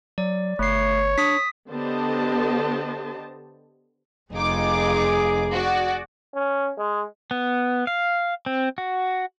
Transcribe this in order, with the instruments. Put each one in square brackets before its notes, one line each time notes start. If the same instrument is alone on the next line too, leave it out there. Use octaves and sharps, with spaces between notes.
[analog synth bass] F#3 [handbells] D5
[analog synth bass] G1 [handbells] A3 C7 [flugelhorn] C#5
[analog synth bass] D4 [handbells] D#6 B6
[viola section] D3 B3 G4 C5 D#5 A5
[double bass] F1 [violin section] D#4 F4 D6 [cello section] G#4
[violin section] F#4 D5
[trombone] C#4
G#3
[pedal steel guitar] B3
F5
C4
F#4